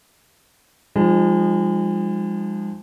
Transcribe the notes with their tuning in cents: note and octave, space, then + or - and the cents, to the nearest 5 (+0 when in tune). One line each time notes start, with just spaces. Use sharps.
F3 +0 G#3 -35 D#4 -25